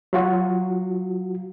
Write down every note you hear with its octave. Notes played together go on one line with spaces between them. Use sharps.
F#3 F4 F#4